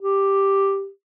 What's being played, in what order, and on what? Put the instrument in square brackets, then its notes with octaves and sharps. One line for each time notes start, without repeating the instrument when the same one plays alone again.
[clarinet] G4